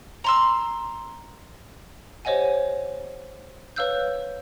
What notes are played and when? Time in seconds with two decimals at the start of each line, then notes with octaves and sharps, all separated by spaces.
0.24 A#5 C6 E6
2.25 G4 C5 C#5 D#5 F#5 G#5
3.76 B4 C#5 F5 E6 F#6 G6